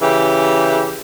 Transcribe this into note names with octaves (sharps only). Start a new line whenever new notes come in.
C#3 E3 G4